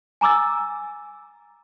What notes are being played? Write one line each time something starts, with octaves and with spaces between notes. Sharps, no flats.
G#5 A#5 D6 E6 A6